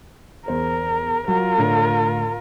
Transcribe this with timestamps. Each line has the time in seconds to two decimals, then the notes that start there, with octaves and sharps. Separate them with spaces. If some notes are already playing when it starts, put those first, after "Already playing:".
0.48 E2 A#4 C5
1.28 F#3 F4 A#4
1.58 A2 D3